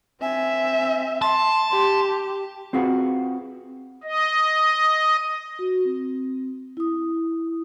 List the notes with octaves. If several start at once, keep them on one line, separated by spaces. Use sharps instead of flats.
C4 E5 G#5
A5 C6
G4
C4 F4 F#4 G#4 B4
D#5
F#4
C4
E4 D#6